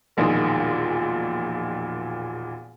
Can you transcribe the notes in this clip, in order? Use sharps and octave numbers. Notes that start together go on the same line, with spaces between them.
E1 A#1 A#2 D#3 C6 D#6